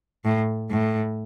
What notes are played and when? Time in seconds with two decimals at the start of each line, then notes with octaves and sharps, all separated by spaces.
0.25 A2
0.70 A2